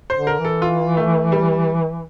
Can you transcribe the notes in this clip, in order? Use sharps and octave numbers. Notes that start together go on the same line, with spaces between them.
C5
D3
A#4
E3
A4
F4
A3
G3